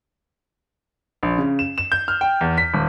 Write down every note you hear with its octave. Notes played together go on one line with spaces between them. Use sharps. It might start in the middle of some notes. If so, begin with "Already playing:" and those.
A#1
C#3
E7
E7
G6
F6
G5
E2
B6
D#1